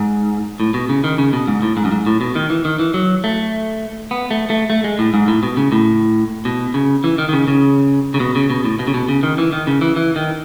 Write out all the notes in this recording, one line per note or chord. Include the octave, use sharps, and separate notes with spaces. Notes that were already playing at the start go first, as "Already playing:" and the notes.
Already playing: G#2
A2
B2
C#3
D#3
C#3
B2
G#2
A2
G#2
F#2
G#2
A2
B2
D#3
E3
D#3
E3
F#3
A3
B3
A3
A3
A3
G#3
A2
G#2
A2
B2
C#3
A2
B2
C#3
E3
D#3
D#3
C#3
C#3
C#3
B2
C#3
B2
A2
B2
C#3
B2
C#3
D#3
E3
D#3
C#3
E3
E3
D#3